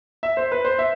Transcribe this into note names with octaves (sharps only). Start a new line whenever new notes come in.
E5
C5
B4
C5
E5